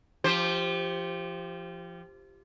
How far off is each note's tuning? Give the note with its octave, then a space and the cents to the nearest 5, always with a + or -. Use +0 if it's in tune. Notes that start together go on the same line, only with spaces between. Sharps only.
F3 -25 G4 +0 C5 +0